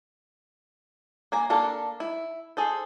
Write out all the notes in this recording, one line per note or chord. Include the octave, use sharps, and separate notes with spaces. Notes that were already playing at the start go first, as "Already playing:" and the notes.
A#3 G#5 A#5
A#3 D4 A4 F5
E4
G#4 A4 C5